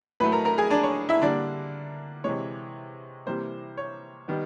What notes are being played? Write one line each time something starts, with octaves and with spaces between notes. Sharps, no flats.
A2 F#3 A3 B4 B5
A#4 A#5
A#4 A#5
G#4 G#5
D4 D5
C#5
E4 E5
D3 G3 A#3 D4 D5
C3 E3 G#3 C#5
C3 E3 G3 A#3 C5
C#5
D#3 G3 B3